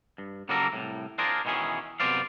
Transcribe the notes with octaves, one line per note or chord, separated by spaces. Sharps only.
G2
C#3 F#3 G3 A#3 A4 A#4
C2 A2
D4 F4 G#4 A#4 C5 D5
B2 D#3 E3 C#4 G#4
F#2 C3 B3 C5 D5 F5